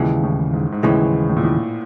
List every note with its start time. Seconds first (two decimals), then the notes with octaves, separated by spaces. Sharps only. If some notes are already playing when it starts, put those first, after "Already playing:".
Already playing: D#2 A#2 C#3 E3 G#3
0.23 A2
0.53 G#2
0.72 G#2
0.83 D#2 A2 C#3 E3 G#3
1.29 A2
1.37 A#2
1.43 A2